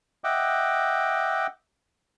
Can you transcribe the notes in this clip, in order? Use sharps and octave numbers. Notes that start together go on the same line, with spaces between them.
D#5 E5 F#5 G5 D6